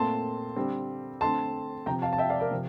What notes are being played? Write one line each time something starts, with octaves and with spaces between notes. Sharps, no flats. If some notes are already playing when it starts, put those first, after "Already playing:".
Already playing: A#2 A3 C4 A5 C6
D3 G3 C4
D3 A3 C4 A5 C6
C3 F3 C4 G5 A#5
F5 A5
A5
E5 G5
D5 F5
A#4 D5
C3 F3